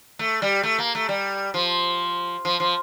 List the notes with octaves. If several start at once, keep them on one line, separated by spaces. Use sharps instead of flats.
A3
G3
A3
A#3
A3
G3
F3
F3
F3